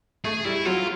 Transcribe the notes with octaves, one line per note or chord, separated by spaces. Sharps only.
A3 G#4
G3 E4
F#3 F4